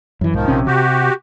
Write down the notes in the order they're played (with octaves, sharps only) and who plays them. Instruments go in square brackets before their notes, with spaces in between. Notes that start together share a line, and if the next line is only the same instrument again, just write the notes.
[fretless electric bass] F#2 E3
[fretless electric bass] B1 G#2 [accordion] D#3 F3
[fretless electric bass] A#1 C3 C#4
[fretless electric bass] C3 [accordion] F#4 G4